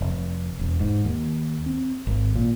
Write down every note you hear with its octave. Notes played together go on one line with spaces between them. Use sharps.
F1
E1
G#2
D#2
C4
G#1
A#2